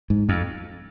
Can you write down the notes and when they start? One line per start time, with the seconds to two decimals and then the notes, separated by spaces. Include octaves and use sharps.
0.10 G#2
0.29 F2